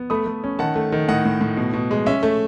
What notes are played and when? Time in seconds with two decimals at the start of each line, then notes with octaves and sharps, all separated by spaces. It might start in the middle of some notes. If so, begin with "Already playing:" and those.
Already playing: B3
0.10 A3 B5 D#6
0.26 A3
0.44 C#4
0.59 D#3 F#5 A5
0.76 A3
0.92 D#3
1.08 A2 D#5 F#5
1.25 A2
1.41 A2
1.57 B2
1.73 B2
1.91 G#3
2.06 C#4 E5
2.23 A3